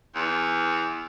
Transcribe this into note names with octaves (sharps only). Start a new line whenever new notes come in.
E2